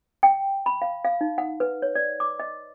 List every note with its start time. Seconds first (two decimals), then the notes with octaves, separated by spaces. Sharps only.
0.23 G5
0.66 B5
0.82 F5
1.05 F5
1.21 D#4
1.38 F#5
1.60 B4
1.82 C#5
1.95 D5
2.20 D6
2.40 D#5